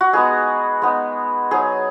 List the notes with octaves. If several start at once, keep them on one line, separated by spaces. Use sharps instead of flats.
F#4
G#3 B3 D#4 G#4
G#3 B3 D#4
F#3 D#4 G#4